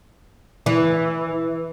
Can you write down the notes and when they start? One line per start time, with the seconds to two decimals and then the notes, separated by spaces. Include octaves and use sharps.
0.66 E3